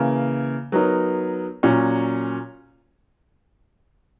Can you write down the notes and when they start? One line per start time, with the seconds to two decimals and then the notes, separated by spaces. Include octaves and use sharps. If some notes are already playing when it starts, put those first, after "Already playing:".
Already playing: C#3 E3 A#3
0.72 F#3 B3 D#4 A#4
1.63 A#2 F#3 C#4